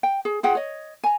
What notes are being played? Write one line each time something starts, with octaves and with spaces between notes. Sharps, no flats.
G5
G#4
F4 G#4 F#5 G5
C#5 D#5
G#5 A#5